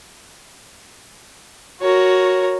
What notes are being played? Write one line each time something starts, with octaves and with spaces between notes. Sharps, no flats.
F#4 A#4 C#5